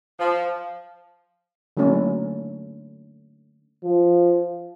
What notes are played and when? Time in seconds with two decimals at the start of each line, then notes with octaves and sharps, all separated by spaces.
0.19 F3
1.77 D3 F#3 A3 A#3 C#4 E4
3.84 F3